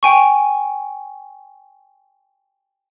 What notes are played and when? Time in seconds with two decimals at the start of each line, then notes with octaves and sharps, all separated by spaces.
0.03 G5 G#5 C#6